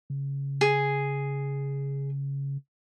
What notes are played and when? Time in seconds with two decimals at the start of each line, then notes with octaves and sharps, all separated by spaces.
0.10 C#3
0.61 G#4